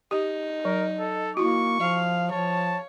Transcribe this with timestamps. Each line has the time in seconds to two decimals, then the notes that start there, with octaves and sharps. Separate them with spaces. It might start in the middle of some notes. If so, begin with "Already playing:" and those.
0.11 D#4 G4
0.65 F#3 A#4
0.99 A4
1.37 A#3 E4 F#4 C#6
1.80 F3 F5
2.32 F3 C#5 A5